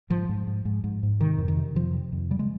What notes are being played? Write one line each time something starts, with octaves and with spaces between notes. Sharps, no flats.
G#2 F3
G#2
G#2
G#2
G#2
G#2
C3 D#3
F2
D#3
C3
F2 F3
C3
F2
C#3 G3
G#3